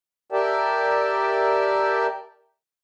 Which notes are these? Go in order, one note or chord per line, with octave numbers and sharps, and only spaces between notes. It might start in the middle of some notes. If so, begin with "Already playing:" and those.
G4 A#4 D5 E5 G5 A5